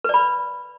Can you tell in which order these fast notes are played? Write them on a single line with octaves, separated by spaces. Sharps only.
B4 D5 B5